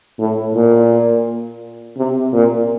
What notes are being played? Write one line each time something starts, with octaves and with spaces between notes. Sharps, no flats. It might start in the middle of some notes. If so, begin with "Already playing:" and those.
A2
A#2
C3
A#2